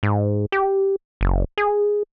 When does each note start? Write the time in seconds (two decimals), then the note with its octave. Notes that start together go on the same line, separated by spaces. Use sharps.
0.03 G#2
0.52 G4
1.21 F#1
1.58 G#4